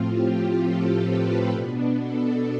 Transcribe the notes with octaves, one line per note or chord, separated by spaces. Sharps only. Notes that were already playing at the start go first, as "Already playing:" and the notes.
Already playing: A2 F3 C4 F4
G4
A4
B4
B2 B3 D4
A4